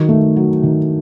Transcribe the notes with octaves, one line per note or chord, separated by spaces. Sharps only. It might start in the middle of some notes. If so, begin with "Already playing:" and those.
Already playing: D#3 F#3
A3
F#3
D#3